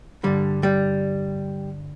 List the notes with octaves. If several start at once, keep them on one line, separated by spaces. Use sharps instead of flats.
G2 D3 G3
G3